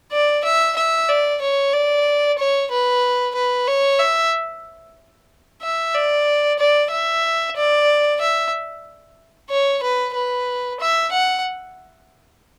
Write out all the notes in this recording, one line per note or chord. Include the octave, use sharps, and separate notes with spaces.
D5
E5
E5
D5
C#5
D5
C#5
B4
B4
C#5
E5
E5
D5
D5
E5
D5
E5
C#5
B4
B4
E5
F#5